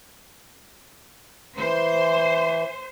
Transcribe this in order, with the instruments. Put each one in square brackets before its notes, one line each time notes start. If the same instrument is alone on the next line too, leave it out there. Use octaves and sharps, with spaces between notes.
[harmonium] E3 [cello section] C5